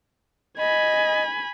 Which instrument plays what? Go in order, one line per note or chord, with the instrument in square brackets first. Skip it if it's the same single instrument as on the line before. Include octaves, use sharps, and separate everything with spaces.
[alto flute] D#5 [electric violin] G#5 B5